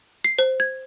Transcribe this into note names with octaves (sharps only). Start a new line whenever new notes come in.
C7
C5
G#6